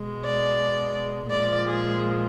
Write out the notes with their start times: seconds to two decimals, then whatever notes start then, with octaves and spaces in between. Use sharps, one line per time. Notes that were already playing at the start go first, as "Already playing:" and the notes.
Already playing: B2 G#3
0.24 D5
1.31 A#2 F3 G#3 D5
1.67 G#4